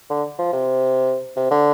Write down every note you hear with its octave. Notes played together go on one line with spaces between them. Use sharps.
D3
F3
C3
C3
D3